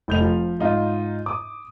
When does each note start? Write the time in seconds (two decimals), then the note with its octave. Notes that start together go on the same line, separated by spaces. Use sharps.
0.08 F1 G6 F7
0.21 F3
0.59 G#2 D#4 F4
1.26 D6 D#6